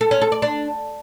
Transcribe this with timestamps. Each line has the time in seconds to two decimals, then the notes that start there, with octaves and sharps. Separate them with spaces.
0.01 A4
0.11 C#4
0.21 A4
0.32 D5
0.42 D4